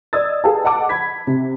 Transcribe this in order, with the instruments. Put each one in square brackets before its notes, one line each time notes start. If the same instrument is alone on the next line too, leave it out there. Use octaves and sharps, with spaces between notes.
[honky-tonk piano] D5 D#5 D#6 E6 G#6 A6
G#4 A4 B4 F5 G5 A5
D#5 F#5 A5 D6
B5 G#6 B6
C3